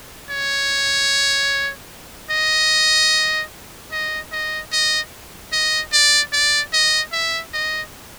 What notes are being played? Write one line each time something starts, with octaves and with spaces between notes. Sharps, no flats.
C#5
D#5
D#5
D#5
D#5
D#5
D5
D5
D#5
E5
D#5